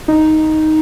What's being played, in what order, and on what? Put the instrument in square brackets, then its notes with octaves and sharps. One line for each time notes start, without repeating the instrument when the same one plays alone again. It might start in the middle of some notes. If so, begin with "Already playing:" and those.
[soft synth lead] D#4